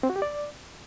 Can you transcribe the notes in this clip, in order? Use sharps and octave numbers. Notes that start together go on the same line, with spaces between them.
C4
F#4
G4
D5